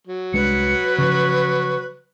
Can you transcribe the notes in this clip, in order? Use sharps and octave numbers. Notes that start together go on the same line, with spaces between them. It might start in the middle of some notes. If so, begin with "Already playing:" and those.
F#3
C2 G#3 D4 B4 C#7
C#3 F3 C#6